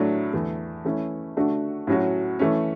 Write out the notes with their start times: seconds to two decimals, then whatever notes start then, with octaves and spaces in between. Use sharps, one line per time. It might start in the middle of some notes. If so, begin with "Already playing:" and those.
Already playing: A2 F#3 A3 D4
0.33 E2 D3 A3
0.85 E3 A3 C#4 E4
1.36 D3 A3 D4 F#4
1.87 A2 F#3 C#4 F#4
2.39 E3 A3 C#4